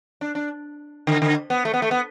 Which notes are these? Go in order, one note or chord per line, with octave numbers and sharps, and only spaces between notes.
D4
D4
D3
D3
B3
A3
B3
A3
B3